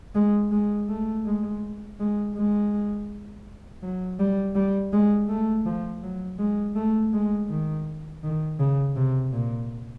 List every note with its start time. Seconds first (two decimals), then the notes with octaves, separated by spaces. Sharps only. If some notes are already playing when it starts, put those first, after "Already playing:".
0.15 G#3
0.51 G#3
0.89 A3
1.25 G#3
1.99 G#3
2.35 G#3
3.83 F#3
4.19 G3
4.55 G3
4.93 G#3
5.29 A3
5.66 F3
6.03 F#3
6.39 G#3
6.75 A3
7.13 G#3
7.49 D#3
8.23 D#3
8.60 C#3
8.96 C3
9.33 A#2